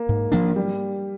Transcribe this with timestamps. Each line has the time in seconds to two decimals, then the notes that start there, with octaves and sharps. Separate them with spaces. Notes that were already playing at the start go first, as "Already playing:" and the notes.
Already playing: A#3
0.09 G#2
0.32 F3 A#3 D4
0.56 G3